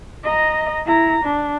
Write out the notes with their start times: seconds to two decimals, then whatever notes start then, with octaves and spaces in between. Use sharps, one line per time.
0.24 D#5 A#5
0.85 E4 A#5
1.24 D4